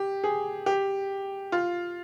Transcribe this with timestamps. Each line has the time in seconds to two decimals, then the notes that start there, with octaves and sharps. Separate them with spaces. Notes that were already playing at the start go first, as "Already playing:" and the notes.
Already playing: G4
0.24 G#4
0.66 G4
1.52 F4